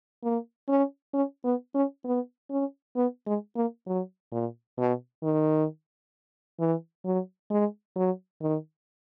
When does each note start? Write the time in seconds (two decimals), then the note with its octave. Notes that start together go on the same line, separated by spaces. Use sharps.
0.23 A#3
0.68 C#4
1.14 C#4
1.45 B3
1.75 C#4
2.05 B3
2.51 C#4
2.96 B3
3.27 G#3
3.56 A#3
3.86 F#3
4.32 A#2
4.78 B2
5.23 D#3
6.60 E3
7.05 F#3
7.51 G#3
7.96 F#3
8.42 D#3